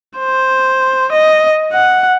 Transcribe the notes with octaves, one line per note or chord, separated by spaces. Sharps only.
C5
D#5
F#5